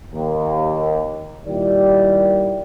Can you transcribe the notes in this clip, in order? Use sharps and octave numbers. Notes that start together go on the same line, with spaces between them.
D#2
A#2 D#3 G3 E4 G4 D5